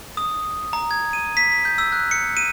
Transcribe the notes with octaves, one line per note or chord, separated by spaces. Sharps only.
D#6
A#5
G#6
D#7
B6
B6
G6
E6
F#6
C#7
D#7